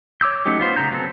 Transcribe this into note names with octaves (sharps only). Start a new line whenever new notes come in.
C#5 D6 E6 G6
F#3 A3 C#4 D#4 G4
B3 F4 C5
C#3 B3 F4 A#5 G6
F#3 B3 C4 A4